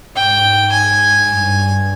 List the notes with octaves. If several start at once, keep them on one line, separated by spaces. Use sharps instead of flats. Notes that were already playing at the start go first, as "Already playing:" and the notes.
G#2 G5
G#5
G2